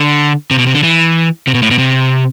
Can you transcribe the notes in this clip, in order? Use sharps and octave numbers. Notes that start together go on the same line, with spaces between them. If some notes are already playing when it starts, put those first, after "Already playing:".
Already playing: D3
C3
B2
C3
D3
E3
C3
B2
A2
B2
C3